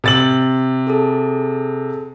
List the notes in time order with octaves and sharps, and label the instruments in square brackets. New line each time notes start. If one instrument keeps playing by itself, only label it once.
[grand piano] C3 A6 F#7
[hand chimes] G#4 A4 A5